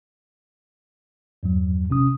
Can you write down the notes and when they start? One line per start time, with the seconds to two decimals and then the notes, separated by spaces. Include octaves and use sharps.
1.43 E2 G2 F#3
1.89 A1 C3 C#4 D#6